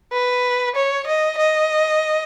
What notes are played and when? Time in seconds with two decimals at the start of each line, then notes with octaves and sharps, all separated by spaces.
0.12 B4
0.75 C#5
1.07 D#5
1.38 D#5